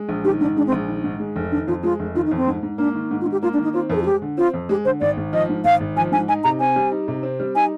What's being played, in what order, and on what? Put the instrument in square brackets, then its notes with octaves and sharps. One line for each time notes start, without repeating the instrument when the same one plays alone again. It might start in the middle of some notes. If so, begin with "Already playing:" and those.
Already playing: [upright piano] G#3
A#1
[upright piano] D#3 [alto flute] G4
[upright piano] G#2 [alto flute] D4
[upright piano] G#3 [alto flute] D4
[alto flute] C4
[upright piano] A#1
D#3
G#2
G#3
F1
[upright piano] D#3 [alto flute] D4
[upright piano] F2 [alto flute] F4
[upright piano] G#3 [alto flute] F4
[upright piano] F1
[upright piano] D#3 [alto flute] F4
[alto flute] D#4
[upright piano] F2
[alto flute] C4
[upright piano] G#2
G#2
[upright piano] A#3 [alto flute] D4
[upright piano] D#3
G#2
[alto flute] F4
[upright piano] G#2
[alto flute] G4
[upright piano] A#3 [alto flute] F4
[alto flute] D4
[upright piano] D#3
[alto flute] D#4
[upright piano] C4 [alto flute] F4
[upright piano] F2 [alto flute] A#4
[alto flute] G#4
F4
[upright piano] G#3 [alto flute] G4
[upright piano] D3
[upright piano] C4 [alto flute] F4
[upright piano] F2
[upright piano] G#3 [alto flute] G4
[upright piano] D3 [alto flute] C5
[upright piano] G#1 [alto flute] D5
[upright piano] G#1
[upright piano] F3 [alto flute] D#5
[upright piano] G#2
[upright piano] G#1 [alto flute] F5
[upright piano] G#1
[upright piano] F3 [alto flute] G#5
[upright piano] G#2 [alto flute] G#5
[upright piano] D#4 [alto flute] G#5
[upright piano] C3 [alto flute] A#5
[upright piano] C4 [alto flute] G#5
[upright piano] G3
D#4
C3
C4
G3
[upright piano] D#4 [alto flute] G#5